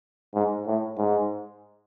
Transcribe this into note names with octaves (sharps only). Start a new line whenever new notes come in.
G#2
A2
G#2